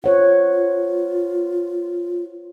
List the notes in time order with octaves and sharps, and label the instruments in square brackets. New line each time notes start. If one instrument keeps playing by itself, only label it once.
[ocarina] F4 [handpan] C5 C#5 F#5